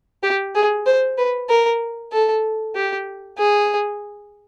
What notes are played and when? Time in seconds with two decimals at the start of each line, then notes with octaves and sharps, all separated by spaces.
0.23 G4
0.55 G#4
0.86 C5
1.17 B4
1.49 A#4
2.12 A4
2.75 G4
3.38 G#4